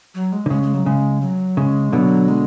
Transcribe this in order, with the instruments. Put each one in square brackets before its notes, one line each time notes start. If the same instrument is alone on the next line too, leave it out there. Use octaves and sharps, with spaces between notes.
[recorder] F#3
G#3
[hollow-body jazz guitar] D3
[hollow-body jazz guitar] C#3 [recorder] G#3
[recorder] G#3
F#3
[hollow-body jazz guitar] C#3 [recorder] G#3
[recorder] F#3
[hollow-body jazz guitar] C#3 [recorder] G#3
[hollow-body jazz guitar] B2 D3 [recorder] F#3
[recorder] G#3